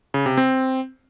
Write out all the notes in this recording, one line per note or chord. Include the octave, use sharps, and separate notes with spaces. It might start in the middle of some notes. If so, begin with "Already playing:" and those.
C#3
C3
C4